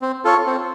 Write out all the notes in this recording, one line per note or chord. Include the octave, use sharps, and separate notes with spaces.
C4
F4 A4 C#5
C4